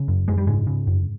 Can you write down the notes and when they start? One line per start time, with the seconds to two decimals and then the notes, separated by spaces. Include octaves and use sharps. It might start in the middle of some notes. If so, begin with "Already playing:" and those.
Already playing: C#3
0.08 F#2
0.28 F#2 G#3
0.38 G3
0.47 G#2 C#3 G#3
0.67 C#3
0.87 F#2